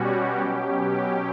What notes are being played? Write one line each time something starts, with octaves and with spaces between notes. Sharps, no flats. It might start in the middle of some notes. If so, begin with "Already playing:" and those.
Already playing: B2 G3 C#4 F#4 G4
B2 F#3 C#4 G4
G4